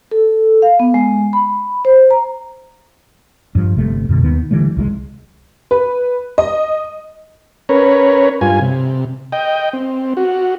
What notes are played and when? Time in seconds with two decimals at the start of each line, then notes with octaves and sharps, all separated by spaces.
0.11 A4
0.62 F5
0.80 B3
0.94 G#3
1.33 B5
1.85 C5
2.11 A#5
3.55 G2 F3
3.76 G1 C3 A3
4.09 F#2 B2 D3
4.22 D#2 D#3 B3
4.51 D3 E3 G3 A3
4.77 C2 E3 G#3
5.71 B4
6.38 D#5
7.69 C#4 A#4 B4 C#5
8.41 G2 F4 G#5
8.61 C3
9.32 D#5 G5
9.73 C4
10.17 F#4